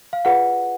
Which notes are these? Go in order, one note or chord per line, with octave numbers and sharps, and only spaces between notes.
F5
F4 G#4 B4 D5 F#5